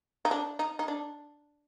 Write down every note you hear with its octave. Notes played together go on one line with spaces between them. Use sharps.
D#4
D4
D#4
D#4
D4